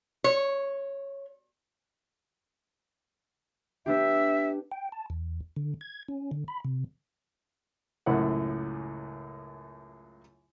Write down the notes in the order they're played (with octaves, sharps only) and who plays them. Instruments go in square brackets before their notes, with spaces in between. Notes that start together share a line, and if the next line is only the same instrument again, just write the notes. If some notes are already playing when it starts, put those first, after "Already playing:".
[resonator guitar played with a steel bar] C#5
[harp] B3 D4 G4 [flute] E5
[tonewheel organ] G5
A5
E2
D3
G#6
C#4
D3
B5
C3
[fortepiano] C#2 F#2 A2 E4 C#5 F#5